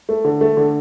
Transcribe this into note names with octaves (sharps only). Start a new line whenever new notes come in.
A3
D3
A3
D3